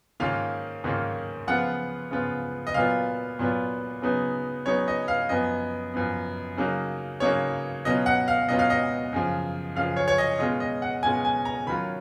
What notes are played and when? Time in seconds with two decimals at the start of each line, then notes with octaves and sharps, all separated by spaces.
0.20 G#2 D#3 A#3 C#4 F4 F5
0.84 G#2 D#3 A#3 C#4 F4
1.47 C#3 F3 B3 F4 F#5
2.11 C#3 F3 B3 F4
2.67 D#5
2.74 A#2 F#3 B3 F4 F5
3.39 A#2 F#3 B3 F4
4.02 C#3 F#3 B3 D#4
4.66 C#3 F#3 B3 D#4 C#5
4.88 D#5
5.08 F5
5.29 F#2 F3 B3 D#5
5.94 F#2 F3 B3
6.57 C#3 F#3 A#3 D#4
7.20 C#3 F#3 A#3 D#4 C#5
7.85 B2 F#3 C#4 F4 D#5
8.06 F#5
8.28 F5
8.48 B2 F#3 C#4 F4 D#5
8.59 F5
8.70 D#5
9.13 F#2 C#3 F3
9.75 F#2 C#3 F3 F5
9.97 C#5
10.08 C#5
10.18 D#5
10.39 B2 G#3 C#4 F4 D#5
10.60 D#5
10.82 F#5
11.03 B2 G#3 C#4 F4 G#5
11.25 G#5
11.45 A#5
11.67 D#3 F#3 C#4 F4 B5